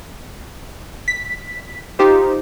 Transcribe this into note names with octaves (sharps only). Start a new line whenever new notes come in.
B6
D#4 F4 G4 C5